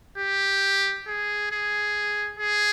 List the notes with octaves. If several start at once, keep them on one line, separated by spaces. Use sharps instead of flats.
G4
G#4
G#4
G#4